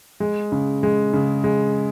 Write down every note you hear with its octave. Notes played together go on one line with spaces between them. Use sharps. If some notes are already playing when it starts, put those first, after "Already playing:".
G#3
C#3
G#3
C#3
G#3